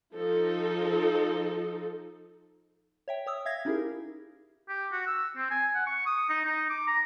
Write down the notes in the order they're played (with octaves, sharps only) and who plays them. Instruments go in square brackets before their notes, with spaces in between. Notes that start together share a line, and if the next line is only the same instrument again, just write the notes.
[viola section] F3 D#4 A4
[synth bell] C#5 E5 G5
C#5 D#6 E6
E5 F5 G#6 A#6
C#4 D#4 E4 G4 G#4 A#4
[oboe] G4
F#4
E6
C4
G#5
F#5
C#6
D#6
D#4
D#4
D6
A#5